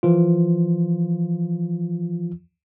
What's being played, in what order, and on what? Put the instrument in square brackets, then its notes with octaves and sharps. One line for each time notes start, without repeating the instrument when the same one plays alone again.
[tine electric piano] E3 F3 F4